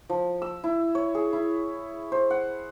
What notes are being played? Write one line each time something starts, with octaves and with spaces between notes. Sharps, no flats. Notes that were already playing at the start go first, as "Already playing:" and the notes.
F3
E6
E4
C#5
G#4
E4
C5
F#5